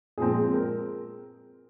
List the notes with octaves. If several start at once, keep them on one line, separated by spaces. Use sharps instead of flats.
A#2 F3 G#3 C4 G#4
G#4
A#4